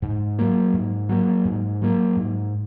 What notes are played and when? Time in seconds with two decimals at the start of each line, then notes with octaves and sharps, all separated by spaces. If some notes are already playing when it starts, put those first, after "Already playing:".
0.02 G#2
0.39 F#3 A#3
0.74 G#2
1.09 F#3 A#3
1.45 G#2
1.82 F#3 A#3
2.17 G#2